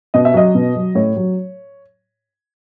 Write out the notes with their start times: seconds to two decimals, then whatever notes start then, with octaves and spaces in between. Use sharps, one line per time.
0.14 B2 D#5
0.25 E5
0.34 F#3 D#5
0.55 B2
0.75 F#3
0.95 A2 C#5
1.16 F#3